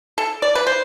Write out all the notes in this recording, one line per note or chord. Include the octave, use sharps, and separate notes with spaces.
A4
D5
B4
C5